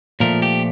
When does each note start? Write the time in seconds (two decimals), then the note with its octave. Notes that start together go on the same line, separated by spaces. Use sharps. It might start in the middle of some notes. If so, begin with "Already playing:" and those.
0.20 A#2 F3 A3 A#4
0.42 G4